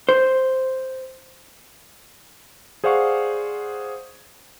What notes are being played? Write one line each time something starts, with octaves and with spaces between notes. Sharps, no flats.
C5
G#4 C5 D5 F5 F#5 C#6